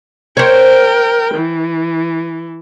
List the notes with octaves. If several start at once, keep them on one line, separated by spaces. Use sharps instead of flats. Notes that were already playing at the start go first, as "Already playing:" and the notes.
A#4 C5 C#5 G5
E3